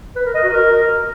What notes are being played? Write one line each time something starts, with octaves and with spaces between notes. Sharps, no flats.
B4
A#4
D#5
F#4
A#4